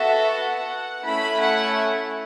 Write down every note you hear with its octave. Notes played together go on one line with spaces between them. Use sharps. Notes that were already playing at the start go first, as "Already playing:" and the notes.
Already playing: B3 F#4 A4 E5
F#5
A3 C#4 E4 B5
F#5